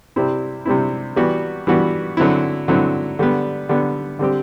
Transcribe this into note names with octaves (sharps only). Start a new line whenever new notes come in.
C3 G3 C4 E4
C3 G3 C4 E4
E3 G3 B3 F#4
E3 G3 B3 F#4
D3 F#3 C4 E4
D3 F#3 C4 E4
D3 G3 B3
D3 G3 B3
D3 G3 C4 G4